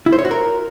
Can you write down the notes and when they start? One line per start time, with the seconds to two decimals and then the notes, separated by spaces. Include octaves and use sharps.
0.06 E4
0.12 C5
0.19 C#5
0.25 F#4
0.31 A#4